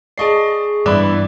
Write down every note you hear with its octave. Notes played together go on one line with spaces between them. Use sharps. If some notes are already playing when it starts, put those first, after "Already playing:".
G#4 D5 D#5 A5 C#6 C7
G2 E3 B3 D5 E5 B5 D6